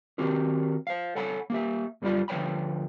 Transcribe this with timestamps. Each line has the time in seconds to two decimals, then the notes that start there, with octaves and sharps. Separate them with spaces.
0.18 D#3 C4 F#4 G4 A#4
0.87 C5 F5
1.15 A4 C#5 F#5 G#5 B5
1.50 A#3 G4 E5
2.02 F#2 G3 B3 F4 D5 B5
2.28 D2 F3 B4 C#5 G5 B5